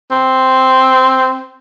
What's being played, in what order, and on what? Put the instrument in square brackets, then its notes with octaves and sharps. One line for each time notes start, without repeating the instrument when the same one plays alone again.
[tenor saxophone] C4